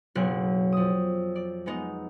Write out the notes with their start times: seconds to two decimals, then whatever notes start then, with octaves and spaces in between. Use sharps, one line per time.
0.15 F#1 B1 A#4 F#6 C7
0.72 F2 D#6
1.36 D5
1.66 G#3 B3 D#4